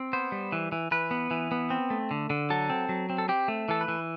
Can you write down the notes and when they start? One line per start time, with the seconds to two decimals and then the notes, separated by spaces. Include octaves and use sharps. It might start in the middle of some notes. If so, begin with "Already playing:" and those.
Already playing: C4
0.13 B3 C5
0.32 G3
0.52 E3
0.72 E3
0.91 E3 B4
1.11 B3
1.31 E3
1.52 B3
1.70 C4
1.90 A3
2.11 D3
2.30 D3
2.50 F#3 A4
2.70 C4
2.89 F#3
3.10 C4
3.18 A4
3.29 C4 G4
3.48 A3
3.69 E3 A4
3.81 B4
3.88 E3